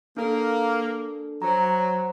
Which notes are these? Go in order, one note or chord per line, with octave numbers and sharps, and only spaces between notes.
A#3 D4 A4
F#3 C5 A#5